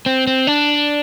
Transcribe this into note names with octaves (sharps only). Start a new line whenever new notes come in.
C4
C4
D4